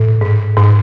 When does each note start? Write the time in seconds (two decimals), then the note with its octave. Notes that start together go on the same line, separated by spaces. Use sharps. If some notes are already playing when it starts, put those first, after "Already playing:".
Already playing: A2
0.21 G#2
0.57 G#2